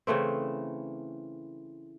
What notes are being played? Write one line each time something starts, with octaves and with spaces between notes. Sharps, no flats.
C#3 E3 A3 C4